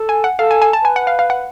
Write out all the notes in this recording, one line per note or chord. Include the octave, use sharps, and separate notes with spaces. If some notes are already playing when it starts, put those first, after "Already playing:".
Already playing: A4
G#5
F#5
A4 F5
G#5
G#5
A5
B4 G#5
F#5
F5
F5
F#5